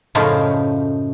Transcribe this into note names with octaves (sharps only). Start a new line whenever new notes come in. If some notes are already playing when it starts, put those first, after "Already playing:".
F#2 A2 C#3 F3 D#4 F4